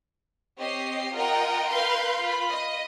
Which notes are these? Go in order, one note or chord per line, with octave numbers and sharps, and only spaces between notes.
C4 G4 C#5 D#5 C7
F4 A#4 D#5 F#5 G5 A#5
A#4 B4 F5 B5 C6 G6
F4 B5
D#5